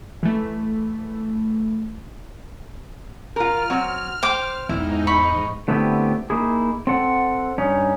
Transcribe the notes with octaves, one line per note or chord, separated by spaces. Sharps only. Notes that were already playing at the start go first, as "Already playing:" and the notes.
E3 A3
F4 A#4 F6
F#3 C4
C5 G5 D6
E2 G#2 D#4 E4
B5 C#6
D3 A3 B3 C4 E4 G4
A#3 D#4 E4 G#4
C4 A4 F#5
G2 C#4 D#4